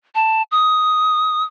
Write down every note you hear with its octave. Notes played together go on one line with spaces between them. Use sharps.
A5
D#6